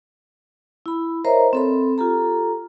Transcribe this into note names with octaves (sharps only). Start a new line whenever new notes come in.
E4 B5
A#4 C5 C#5 D#5 E5 A#5
C4 A4 B5
F4 G4 A4 A#5